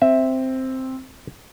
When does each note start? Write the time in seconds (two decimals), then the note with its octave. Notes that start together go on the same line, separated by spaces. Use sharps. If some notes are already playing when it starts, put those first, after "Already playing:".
0.02 C4 E5